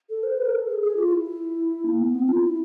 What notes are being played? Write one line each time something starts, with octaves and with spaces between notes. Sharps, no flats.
A4
C5
B4
A#4
A4
G#4
G#4
F4
E4
A#3
B3
C4
F4
E4